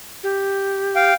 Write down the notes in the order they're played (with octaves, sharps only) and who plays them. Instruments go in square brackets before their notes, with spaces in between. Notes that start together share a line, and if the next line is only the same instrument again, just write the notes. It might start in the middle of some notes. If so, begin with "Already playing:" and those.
[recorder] G4
[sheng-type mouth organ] F5 G5